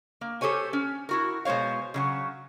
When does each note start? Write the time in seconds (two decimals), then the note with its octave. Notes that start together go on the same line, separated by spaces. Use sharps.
0.21 A#3
0.41 G4 A4 C5 C#5 G#5
0.73 C#4
1.09 E4 F#4 A#4
1.45 B2 G#3 C5 C#5 F5
1.94 C#3 F#3 F#5